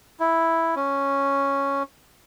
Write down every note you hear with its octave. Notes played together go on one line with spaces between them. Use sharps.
E4
C#4